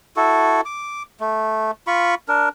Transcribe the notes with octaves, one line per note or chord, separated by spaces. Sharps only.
E4 F#4 A4
D6
A3
F4 B5 C#6
D4 A#4